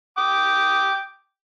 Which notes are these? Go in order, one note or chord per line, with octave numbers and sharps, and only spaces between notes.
G5 D6 D#6